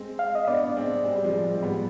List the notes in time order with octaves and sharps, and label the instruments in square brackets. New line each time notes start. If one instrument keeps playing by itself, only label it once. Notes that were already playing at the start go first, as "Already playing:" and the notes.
Already playing: [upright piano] G#3 C4
[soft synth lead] F5
D#5
[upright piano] B3 D4 [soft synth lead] D5
[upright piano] D4
G#3 C4
G#3 C4
G3
F3 G#3
G#3 C4
C4
G3 B3